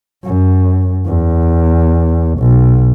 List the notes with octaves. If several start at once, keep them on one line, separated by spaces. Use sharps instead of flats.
F#2
E2
B1